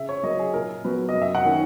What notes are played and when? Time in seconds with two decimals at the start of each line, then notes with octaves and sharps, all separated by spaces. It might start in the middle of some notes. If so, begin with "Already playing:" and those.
Already playing: C#3 E5
0.09 C#5
0.23 F#3 A#3 D#5
0.39 G#4
0.54 A#2 A#4
0.84 F#3 B3 B4
1.09 D#5
1.15 F#2
1.22 E5
1.35 F#5
1.45 D#3 A#3 C#4